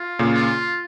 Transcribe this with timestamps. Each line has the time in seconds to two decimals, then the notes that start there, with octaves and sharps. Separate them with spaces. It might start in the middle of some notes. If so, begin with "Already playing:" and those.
Already playing: F4
0.19 A#2 C#3
0.34 F4